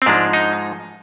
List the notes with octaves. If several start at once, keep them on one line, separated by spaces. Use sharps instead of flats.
C4
G#2 F3 G#3 D4
D#4